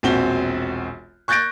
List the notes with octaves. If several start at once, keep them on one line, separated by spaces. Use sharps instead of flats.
E1 A#1 C4 F#4 G7
C#6 F#6 G6 A6 A#6 D7